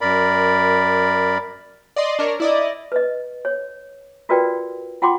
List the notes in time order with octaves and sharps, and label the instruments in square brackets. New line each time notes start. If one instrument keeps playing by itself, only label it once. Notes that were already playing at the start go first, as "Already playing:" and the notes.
[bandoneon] F#2 A#4 D5 B5
[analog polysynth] D5 D#5 C6
D4 A#4 C#5
E4 D5 D#5
[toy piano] B4 D#5
C#5
F4 F#4 A#4 B4 D5 G5
F4 F#5 G5 C6 D6